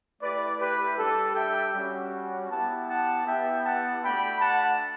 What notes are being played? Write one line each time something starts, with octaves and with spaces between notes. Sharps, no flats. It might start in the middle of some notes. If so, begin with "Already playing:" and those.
A3 E4 G4 B4 D5
G4 B4
G3 D4 G4 A4
E5 G5
G3 C#4 F#4
B3 E4 G4 F#5 A5
F#5 A5
B3 E4 G4 E5 G5
F#5 A5
A3 D4 F#4 G5 B5
F#5 A5